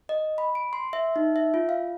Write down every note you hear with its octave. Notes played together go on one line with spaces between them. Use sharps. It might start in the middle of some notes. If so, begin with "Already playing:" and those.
D#5
B5
D7
C6
E5
D#4
E5
F4
F5